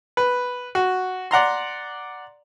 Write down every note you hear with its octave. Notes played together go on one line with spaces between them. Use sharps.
B4
F#4
D5 F#5 A#5 C6